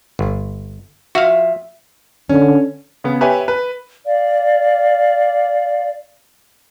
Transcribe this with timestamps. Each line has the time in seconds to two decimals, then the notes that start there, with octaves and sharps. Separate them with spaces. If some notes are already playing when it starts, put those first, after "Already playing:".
0.19 G1
1.15 F3 F4 F#4 E5 F5
2.30 D3 C#4
3.04 C#3 B3
3.21 G4 B4 C#5 E5 G#5
3.48 B4
4.05 D5 F5